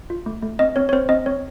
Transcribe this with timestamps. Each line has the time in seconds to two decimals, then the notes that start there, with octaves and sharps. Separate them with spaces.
0.10 F4
0.26 A3
0.43 A3
0.59 C4 D#5
0.76 C4 C#5
0.89 C#5
0.93 C4 C5
1.09 C4 D#5
1.26 C4 C#5